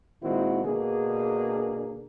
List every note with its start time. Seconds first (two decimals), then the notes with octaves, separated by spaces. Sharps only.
0.22 A#2 D#3 G#3 C4 E4 F#4
0.64 B2 D3 A#3 D4 G#4